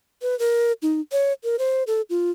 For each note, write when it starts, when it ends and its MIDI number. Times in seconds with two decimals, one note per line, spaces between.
0.22 0.37 71
0.39 0.72 70
0.82 1.01 63
1.12 1.33 73
1.44 1.56 70
1.59 1.83 72
1.87 2.01 69
2.10 2.31 65